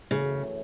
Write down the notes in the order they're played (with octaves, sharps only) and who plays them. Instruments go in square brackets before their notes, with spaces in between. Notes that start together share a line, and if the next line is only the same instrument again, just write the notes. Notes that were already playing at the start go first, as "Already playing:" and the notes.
[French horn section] F#2 E3 A3 F#4 C#5 [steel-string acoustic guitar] C#3